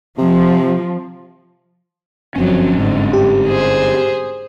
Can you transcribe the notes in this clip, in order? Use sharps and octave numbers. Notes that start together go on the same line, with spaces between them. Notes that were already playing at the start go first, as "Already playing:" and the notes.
C3 F3
G1 F#2 F3 F#3 C4 C#4
G#2 D3
G4
G#4 C5